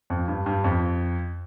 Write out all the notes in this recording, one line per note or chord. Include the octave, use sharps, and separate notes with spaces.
F2
G2
G2
F2